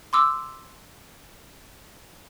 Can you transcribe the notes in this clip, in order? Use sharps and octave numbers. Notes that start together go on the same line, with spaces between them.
C6 D6 E6